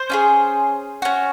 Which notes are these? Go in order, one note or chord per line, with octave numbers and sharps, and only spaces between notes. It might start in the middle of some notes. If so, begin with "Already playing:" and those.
Already playing: C5
C#4 F4 G#4
C#4 F#4